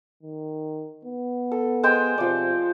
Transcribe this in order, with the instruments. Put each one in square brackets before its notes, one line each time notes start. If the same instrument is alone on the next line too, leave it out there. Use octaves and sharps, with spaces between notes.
[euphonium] D#3
B3
[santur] A4
G#3 C5 G5
[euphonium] C3 [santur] F3 D5